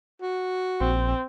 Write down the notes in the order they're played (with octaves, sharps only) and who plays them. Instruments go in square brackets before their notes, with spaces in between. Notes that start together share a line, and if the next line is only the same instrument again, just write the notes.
[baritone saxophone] F#4
[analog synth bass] A#1 [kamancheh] C4